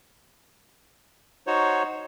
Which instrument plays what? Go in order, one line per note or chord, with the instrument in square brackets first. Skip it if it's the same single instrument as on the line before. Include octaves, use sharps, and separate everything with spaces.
[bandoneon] D#4 F#4 C5 C#5